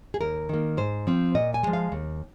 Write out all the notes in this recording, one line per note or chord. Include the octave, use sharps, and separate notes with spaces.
G#4
D#2 A#4
D#3 A#3
G#2 C5
F3 C4
A#2 D#5
G#5
F3 G#3
F5
D#2